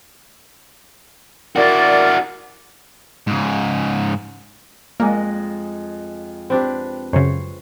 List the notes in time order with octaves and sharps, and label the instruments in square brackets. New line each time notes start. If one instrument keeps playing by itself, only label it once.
[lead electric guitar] E4 F#4 [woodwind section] A#4 D5
[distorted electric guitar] G#2 C#3
[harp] F2 G#3 D#5 [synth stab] A#3
[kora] C4 D4 G4 [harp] B4
[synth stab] F#2 C#3 [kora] C5 C#5